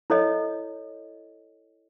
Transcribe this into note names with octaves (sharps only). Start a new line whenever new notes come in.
E4 A4 C#5 D#5